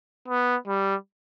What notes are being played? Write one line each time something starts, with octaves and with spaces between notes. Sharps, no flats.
B3
G3